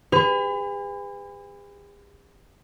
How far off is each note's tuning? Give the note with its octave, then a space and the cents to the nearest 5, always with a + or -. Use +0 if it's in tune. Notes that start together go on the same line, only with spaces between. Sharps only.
G#4 -45 B4 +30